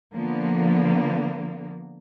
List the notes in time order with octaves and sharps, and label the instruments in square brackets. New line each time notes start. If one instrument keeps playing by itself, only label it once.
[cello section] D3 F3 A#3 B3